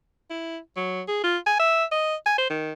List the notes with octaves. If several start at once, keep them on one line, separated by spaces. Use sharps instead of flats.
E4
F#3
G#4
F4
G#5
E5
D#5
G#5
C5
D#3